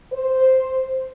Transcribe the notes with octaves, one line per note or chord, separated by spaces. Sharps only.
C5